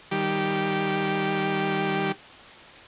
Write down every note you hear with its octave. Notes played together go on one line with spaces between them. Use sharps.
D#3 G3 G4